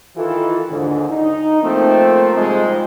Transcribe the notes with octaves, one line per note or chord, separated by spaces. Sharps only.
D#3 E3 F4 A4
D#2 G#2 D3
D#4
F3 A3 A#3 C4
G#2 C3 F3 G3 G#3